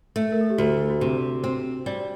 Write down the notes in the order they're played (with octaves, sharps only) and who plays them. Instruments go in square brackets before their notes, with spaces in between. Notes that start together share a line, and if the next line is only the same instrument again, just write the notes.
[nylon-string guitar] A3
[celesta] A#4
A4
G4
[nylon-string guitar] D2 [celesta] F#4
[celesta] F#4
[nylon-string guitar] C3 [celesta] G4
[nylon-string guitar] C4 [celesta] C5
[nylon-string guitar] G3 [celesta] D5